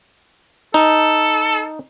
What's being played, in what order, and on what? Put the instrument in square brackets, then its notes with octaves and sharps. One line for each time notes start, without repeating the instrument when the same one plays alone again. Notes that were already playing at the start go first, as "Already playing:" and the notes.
[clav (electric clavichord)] D#4 [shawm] A4